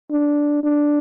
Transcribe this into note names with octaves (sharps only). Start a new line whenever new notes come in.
D4
D4